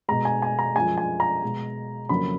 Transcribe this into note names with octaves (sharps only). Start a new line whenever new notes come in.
B2 G#3 A#5
G#5
G#5
A#5
F#2 F3 G#3 G#5
G#5
A#5
B2 G#3
F2 C#3 F#3 A#3 B5